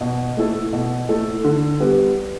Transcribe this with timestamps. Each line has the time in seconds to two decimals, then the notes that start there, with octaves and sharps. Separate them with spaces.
0.01 B2
0.37 A3 E4 A4
0.73 B2
1.09 A3 E4 A4
1.44 D3
1.80 G3 B3